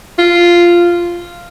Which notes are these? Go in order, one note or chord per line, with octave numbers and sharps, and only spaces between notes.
F4